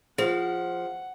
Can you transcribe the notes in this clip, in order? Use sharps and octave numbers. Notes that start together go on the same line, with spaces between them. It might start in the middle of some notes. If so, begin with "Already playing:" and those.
F3 G#4 C5 F#5